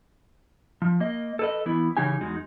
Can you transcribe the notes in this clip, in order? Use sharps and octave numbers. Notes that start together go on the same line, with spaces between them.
F3
A#3 D#5
A4 B4 D#5
E3 B3 E4
C#3 E3 D#4 G4 G#5
E2 G#3 D#4 F#4